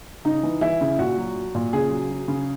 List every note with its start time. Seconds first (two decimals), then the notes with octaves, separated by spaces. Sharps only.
0.25 C#3 D#4
0.43 E3
0.61 E3 E4
0.81 C#3
0.98 A#2 F#4
1.18 F#3
1.36 F#3
1.55 A#2
1.73 C#3 G#4
1.91 F#3
2.10 F#3
2.28 C#3